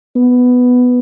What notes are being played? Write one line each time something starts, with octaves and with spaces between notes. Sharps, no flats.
B3